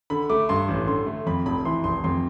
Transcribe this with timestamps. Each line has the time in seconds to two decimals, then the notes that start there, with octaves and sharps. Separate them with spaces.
0.10 D3 B5
0.29 A3 D6
0.49 G2 C6
0.68 A1
0.87 D3 C6
1.06 A3
1.26 F2 B5
1.46 F1 B5
1.65 E3 C6
1.84 F1 C6
2.04 F2 C6